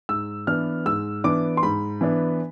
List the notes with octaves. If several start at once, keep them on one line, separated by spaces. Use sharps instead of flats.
G#2 E6
E3 B3 D4 F6
G#2 E6
E3 B3 D4 D6
C6
G#2 B5
E3 B3 D4